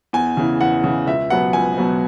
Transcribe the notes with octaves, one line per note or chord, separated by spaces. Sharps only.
E2 G#5
C#3 E3
E2 F#5
C#3 E3
C#2 E5
B2 F#3 B3 F#5
C#2 G#5
B2 F#3 B3